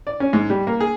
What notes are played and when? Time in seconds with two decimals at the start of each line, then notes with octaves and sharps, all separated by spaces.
0.07 D5
0.20 C#4
0.33 G#2
0.50 G3
0.67 A#3
0.80 G#4